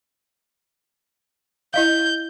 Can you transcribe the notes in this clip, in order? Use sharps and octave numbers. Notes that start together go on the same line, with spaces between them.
E4 D#5 F5 G6